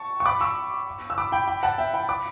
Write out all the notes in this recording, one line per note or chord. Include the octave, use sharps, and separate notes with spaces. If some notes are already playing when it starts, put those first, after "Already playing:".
Already playing: A5 C#6
C#6
B5 D6
C#6 E6
E6
B5 D6
G5 B5
G5 B5
F#5 A5
E5 G5
G5 B5
B5 D6